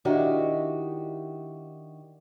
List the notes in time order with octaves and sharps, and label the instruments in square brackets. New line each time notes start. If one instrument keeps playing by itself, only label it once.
[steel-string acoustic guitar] D#3 D4 E4 F#4 G4 D#5